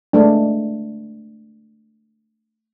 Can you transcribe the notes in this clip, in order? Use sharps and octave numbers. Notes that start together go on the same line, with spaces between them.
G#3 A3 D4